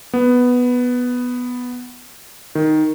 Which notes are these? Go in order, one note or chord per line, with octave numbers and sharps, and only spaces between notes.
B3
D#3